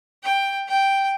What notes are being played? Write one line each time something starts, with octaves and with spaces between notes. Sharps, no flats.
G5
G5